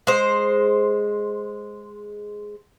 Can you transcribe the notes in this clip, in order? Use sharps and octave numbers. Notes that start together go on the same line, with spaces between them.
G#3 C5